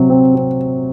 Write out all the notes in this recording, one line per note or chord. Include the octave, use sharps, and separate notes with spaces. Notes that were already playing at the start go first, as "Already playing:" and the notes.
Already playing: C3 F#3
C4
C4